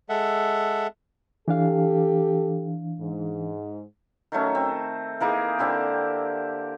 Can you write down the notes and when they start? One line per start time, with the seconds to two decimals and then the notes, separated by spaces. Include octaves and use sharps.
0.09 G#3 A4 E5 F#5
1.48 E3 D4 G4 A4 F5
2.99 G#2
4.32 D#3 F#3 A3 C#4
4.55 C4
5.20 E3 A#3 D#4 G#4
5.59 D3 C4 E4 G4